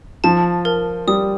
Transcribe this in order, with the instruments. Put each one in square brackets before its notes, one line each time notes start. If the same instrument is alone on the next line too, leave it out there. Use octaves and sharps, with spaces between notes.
[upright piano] F3 [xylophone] A5
[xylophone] A#4
[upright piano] G3 [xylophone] D#6